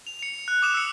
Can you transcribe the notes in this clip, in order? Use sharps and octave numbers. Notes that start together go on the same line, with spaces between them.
F7
C#7 F7
F#6
D6 D#6 E7
E6 C#7